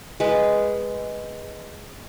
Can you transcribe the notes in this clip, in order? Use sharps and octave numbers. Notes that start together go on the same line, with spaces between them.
G#3 B4